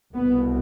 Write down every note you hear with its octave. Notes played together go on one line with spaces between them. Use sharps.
C2 B2 B3